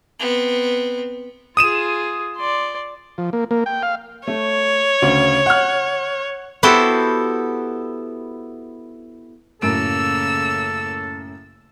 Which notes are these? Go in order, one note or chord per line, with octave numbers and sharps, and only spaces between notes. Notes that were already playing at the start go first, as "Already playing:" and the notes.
B3 C4
F4 G#4 D#6 D#7 E7
D5 C6
F3
A#3
A#3
G5
F5
A3 C#5
D2 C#3
F#5 F6
B3 E4 F#4 G4 A4 C5
F#2 A2 C#3 A#3 A4 E6 D7